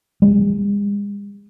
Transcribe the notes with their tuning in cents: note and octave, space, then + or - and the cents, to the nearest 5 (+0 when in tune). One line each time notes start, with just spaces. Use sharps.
G#3 -45